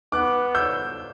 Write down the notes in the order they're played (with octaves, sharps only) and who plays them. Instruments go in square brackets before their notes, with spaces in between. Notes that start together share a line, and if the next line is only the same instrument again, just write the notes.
[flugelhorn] B3 [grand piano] D6 F#6
[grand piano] E6 G6